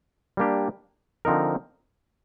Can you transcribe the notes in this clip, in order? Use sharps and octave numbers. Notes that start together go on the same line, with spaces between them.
G3 A#3 D4 G4
D3 F3 C4 D#4 A#4